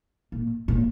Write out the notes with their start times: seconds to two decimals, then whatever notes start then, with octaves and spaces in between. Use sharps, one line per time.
0.32 A#2
0.68 A#2